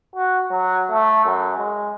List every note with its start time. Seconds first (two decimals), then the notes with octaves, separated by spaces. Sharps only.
0.16 F#4
0.51 F#3
0.91 A3
1.25 F#2
1.58 G#3